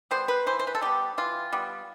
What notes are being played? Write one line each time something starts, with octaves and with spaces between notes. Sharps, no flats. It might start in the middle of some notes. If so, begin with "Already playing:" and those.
G3 B3 C5
B4
E3 C5
C5
B4
A4
G3 B3 G4
E3 F4
G3 B3